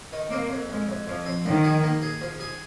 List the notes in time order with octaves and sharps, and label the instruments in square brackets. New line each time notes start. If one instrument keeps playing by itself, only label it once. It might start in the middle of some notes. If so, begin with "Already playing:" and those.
[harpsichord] D#3
[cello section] A#3 [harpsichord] C4
[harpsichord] F2
[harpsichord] F2 [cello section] G#3
[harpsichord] F2
[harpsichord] F2 [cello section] F3
[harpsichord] C4
[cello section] D#3 [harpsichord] A#3
[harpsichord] G#4
A#3
G#4
F3
G#4